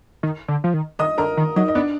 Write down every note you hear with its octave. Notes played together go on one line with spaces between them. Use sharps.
D#3
D3
F3
D#3
D#3 D#5 D#6
D3 A#4 A#5
D#3
F#3 D#4 D#5
D#5
B3 D4 D5